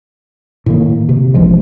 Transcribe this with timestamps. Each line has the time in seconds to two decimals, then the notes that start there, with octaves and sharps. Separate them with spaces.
0.66 A2 D#3 A#3
1.09 C3
1.34 D#1 A1 F3 G#3